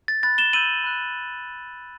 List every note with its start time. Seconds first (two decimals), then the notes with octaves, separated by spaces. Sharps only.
0.08 A6
0.23 B5 F#6 A6
0.38 E7 G7
0.53 B5 E6 G6 D#7 F#7
0.84 B5 F#6